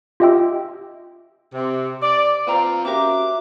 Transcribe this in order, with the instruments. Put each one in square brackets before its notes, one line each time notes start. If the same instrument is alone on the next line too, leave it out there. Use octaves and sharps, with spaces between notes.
[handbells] F4 G4 D#5 E5 G5 E6
[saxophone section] C3
D5
[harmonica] C4 F4 [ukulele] B4 G5 A#5
[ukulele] C#4 G4 A#4 [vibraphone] F#4 E5 [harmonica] D6